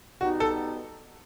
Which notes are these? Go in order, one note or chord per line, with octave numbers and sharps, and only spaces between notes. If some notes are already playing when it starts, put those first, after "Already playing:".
B2 G3 B3 D#4 F#4
A4